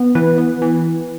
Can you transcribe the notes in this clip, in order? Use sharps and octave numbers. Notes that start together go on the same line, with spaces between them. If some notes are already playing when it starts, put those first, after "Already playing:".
Already playing: B3
E3 B4
B3
E3